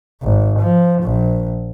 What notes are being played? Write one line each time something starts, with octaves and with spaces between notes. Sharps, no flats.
G#1
F3
A#1